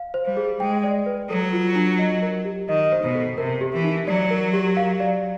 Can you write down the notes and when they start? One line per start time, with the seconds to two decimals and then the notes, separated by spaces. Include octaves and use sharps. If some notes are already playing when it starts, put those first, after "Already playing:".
Already playing: F5
0.14 C5
0.25 G3
0.37 G#4
0.60 G#3 G5
0.84 D5
1.06 B4
1.29 F#3 A4
1.53 F4
1.75 D4
1.99 D#5
2.22 A#4
2.45 G4
2.68 D#3 D#5
2.92 C5
3.03 B2
3.15 A4
3.38 C3 A#4
3.61 G4
3.72 E3
3.84 D#4
4.07 F#3 D5
4.31 A#4
4.53 G4
4.77 F5
5.00 D5